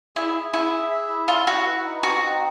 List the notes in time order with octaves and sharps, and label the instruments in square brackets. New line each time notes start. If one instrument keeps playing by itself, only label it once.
[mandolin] E4 [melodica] G#4
[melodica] G#4
[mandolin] E4 [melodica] E5
[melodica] G#4
E5
E4
[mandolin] F4 [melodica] E5
[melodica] E4 [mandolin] F#4
[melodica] B4
D#4
[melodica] C4 [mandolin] F#4
[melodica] D#4